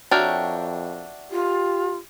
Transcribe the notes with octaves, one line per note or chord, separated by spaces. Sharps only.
F2 D4 F#4 A#4 C#5 E5 G5
F4 G4